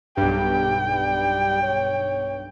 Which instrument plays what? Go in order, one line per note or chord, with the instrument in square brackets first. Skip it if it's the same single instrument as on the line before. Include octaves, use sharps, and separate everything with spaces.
[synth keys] B1 G2 [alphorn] G4 [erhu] G5
[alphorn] G3
C#5